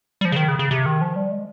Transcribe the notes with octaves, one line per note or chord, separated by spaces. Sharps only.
G3
F3
C#3
D#3
C#3
C#3
C3
D#3
F3
G3
G#3